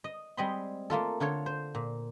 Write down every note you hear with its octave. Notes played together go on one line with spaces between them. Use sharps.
D#5
G3 G#3 C4 D#5 B5 C6
A3 A#3 F4 A4
D3 F4 A4 C#5
C5
A#2